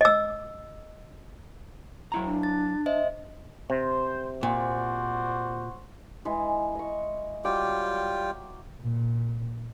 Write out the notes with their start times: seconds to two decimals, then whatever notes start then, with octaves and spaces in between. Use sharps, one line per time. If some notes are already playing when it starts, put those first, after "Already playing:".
0.01 D#5 E6
2.12 F#3 E4 A#5
2.25 D4
2.43 A6
2.86 C5 D#5 E5
3.70 C3 C5
4.43 A#2 F#4 C5 D5
6.25 E3 G#3
6.75 D#5 C#6
7.45 F#3 G3 F4 G5 D6
8.81 A#2